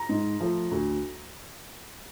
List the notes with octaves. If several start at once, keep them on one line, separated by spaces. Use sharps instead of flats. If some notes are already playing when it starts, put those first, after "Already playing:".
Already playing: A#5
G#2
F3 A3
D2